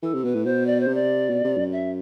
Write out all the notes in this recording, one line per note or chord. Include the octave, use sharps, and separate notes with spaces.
E3 A4
C3
B2 B4
A2
B2 C5
D5
C5
C3
D5
B2
C3
F#2
E5